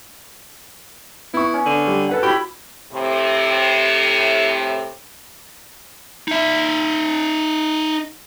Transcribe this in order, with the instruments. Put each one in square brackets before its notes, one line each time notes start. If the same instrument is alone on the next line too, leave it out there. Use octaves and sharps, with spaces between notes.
[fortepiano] B3 C#6 [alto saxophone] E4
[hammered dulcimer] C#4
[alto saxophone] D3
[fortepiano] G3
A4 B4 F#5
[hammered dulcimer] E4 B5 [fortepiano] F#4 [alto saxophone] G4
[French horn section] A2 C3
[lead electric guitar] D#4 E5